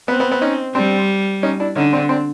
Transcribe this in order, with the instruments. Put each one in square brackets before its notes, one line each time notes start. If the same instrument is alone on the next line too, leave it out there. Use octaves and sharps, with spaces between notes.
[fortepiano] B3 [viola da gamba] C4
[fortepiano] B3
B3
C#4 D#4
[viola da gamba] G3 [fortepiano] C4 D4
[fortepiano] C#4 D#4
D4 E4
[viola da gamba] D3 [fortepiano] C#4 D#4
[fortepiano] C4 D4
C4 D4